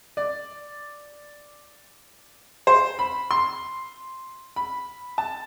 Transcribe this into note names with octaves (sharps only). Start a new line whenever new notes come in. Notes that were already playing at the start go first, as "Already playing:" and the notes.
D5
C5
B5
C6
B5
A5